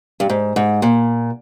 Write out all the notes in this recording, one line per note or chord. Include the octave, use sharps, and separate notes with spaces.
G2
G#2
G#2
A#2